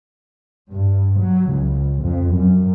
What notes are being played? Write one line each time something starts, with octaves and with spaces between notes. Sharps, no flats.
G2
F#3
C#2
F2
F#2